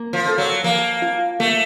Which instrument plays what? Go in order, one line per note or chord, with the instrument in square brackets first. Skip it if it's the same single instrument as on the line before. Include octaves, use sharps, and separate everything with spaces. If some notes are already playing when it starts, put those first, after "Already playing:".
Already playing: [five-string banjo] A#3
[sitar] F3
[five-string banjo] A4
[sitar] F#3
[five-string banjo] F3 [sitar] A#3
[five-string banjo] F4
[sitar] A3 [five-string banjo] A#3